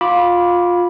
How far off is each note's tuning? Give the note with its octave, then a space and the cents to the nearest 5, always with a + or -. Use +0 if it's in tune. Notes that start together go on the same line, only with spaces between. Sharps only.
F4 +15 B5 -10 D6 -5